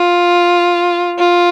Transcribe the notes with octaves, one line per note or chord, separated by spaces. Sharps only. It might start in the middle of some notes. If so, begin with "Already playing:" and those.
Already playing: F4
F4